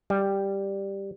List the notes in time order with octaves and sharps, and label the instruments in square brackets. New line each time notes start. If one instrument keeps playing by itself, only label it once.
[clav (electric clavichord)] G3